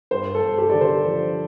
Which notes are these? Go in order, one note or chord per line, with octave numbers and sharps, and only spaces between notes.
G2 C5
A4
G2
G4
D3 D5
C5
F3